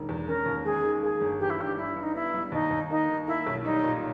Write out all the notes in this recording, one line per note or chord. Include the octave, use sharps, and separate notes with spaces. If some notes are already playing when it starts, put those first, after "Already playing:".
Already playing: E1 D#3 A#3
E2
C#4 A#4
D#2
G#3 G#4
D#3
A#3 G#4
G1
E3 G4
E4
G2 G4
G2 E4
G2
D#4
B3 E4
G3
D#2 D#4
D#2
A#3 D#4
D#3
A#3 E4
B1
G3 D#4
A#2